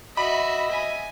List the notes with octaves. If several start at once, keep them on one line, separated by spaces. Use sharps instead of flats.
F#4 D#5 E5 B5
G#5